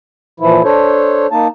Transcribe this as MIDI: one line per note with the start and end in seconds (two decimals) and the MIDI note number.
0.40 0.62 46
0.40 0.62 52
0.40 0.62 53
0.40 0.62 64
0.64 1.27 62
0.64 1.27 69
0.64 1.27 72
0.64 1.27 73
1.31 1.48 58
1.31 1.48 63
1.31 1.48 81